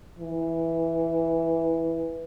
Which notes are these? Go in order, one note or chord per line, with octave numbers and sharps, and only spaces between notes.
E3